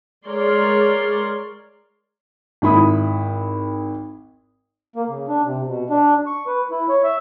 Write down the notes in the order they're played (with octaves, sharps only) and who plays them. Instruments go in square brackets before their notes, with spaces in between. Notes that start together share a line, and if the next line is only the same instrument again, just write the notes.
[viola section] G#3 A#4 C#5 D5 C6
[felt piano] G#1 E4 B5 D#6
[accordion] A#3
C#3
D4
C3
B2
D4
C#6
B4
E4
C#5
E5